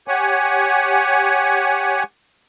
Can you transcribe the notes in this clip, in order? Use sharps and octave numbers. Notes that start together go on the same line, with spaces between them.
G4 C#5 F#5 G#5